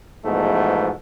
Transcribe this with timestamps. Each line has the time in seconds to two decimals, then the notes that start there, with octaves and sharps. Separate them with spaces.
0.24 E2 G#2 B2 F3 A3